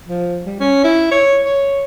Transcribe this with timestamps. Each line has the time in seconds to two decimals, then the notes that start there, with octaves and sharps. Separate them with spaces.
0.07 F3
0.46 G3
0.60 C#4
0.84 E4
1.11 C#5
1.45 C#5